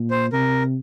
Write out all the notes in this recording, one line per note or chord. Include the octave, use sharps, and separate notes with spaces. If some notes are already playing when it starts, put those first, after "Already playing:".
Already playing: A#2
C5
C3 A#4